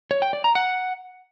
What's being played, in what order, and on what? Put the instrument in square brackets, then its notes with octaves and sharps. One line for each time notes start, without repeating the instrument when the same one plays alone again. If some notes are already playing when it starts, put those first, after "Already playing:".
[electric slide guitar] C#5
G5
D5
A#5
F#5